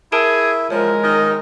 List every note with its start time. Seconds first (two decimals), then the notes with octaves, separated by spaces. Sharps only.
0.12 E4 G#4 A#4 A5 D7
0.70 F3 G#3 A#4 C#5
1.03 D#3 D#5